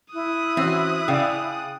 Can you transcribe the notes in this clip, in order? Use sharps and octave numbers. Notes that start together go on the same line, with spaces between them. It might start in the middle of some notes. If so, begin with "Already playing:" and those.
E4 D#6 F#6
E3 C4 C#4 F#4
C#3 D5 F5 G5